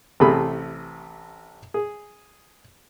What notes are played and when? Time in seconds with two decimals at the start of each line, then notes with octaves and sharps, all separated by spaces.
0.20 A1 C3 A3 G#4 B5
1.74 G#4